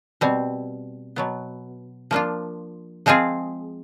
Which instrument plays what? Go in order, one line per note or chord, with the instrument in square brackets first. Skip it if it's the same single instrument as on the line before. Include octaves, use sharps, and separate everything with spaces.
[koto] B2 G3 C4
B2 F#3 B3
F3 A#3 D4 F4
F3 G#3 C4 F4 G#4